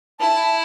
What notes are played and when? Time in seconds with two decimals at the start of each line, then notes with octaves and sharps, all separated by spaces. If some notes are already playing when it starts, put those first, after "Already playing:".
0.19 E4 A5